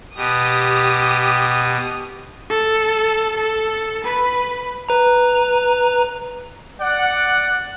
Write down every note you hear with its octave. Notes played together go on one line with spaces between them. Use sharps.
B2 G4 D#6
A4
A4
B4 B5
B4 A#5
D5 F#5